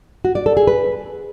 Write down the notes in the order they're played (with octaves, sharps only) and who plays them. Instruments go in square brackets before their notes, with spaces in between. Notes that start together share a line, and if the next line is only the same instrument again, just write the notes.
[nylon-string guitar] F#4
D5
A4
G#4
B4